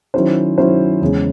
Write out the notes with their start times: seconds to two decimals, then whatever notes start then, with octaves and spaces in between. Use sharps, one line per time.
0.14 D#3 F#3 C#4 E4 C5
0.58 D#3 F#3 C#4 E4 C5
1.01 E2 C#3 G#3 C#4 G#4